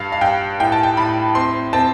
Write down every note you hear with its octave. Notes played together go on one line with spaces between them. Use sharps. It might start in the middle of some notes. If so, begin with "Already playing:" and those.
Already playing: G2 F5
F5
G2 G5
A2 G5
A5
G5
A2 B5
C4 C6
C4 A5